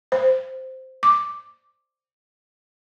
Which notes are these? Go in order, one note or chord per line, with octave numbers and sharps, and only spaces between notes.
C5
D6